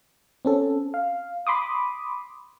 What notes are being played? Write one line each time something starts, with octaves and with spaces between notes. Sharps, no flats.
C4 C#4 A4
F5
B5 C6 D6 D#6